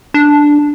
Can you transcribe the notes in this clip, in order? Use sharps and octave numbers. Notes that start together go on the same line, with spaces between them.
D4